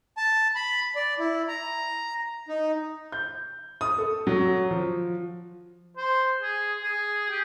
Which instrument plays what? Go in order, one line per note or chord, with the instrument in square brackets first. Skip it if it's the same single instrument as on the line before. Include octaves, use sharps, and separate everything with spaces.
[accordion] A5
B5
D5
E4
A#5
D#4
[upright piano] G6
D#6
A4
F#3
F3
[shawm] C5
G#4
G#4
G4